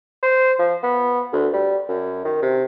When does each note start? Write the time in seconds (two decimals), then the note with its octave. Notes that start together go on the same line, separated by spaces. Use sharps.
0.23 C5
0.59 F3
0.83 B3
1.33 D2
1.53 G3
1.88 F#2
2.25 D#3
2.42 C3